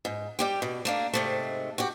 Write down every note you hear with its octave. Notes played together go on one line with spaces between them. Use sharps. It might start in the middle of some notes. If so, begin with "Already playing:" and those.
G#2
G3 G4 G5
B2
A3 A#3 D4
G#2 C3 A3
F#4 G4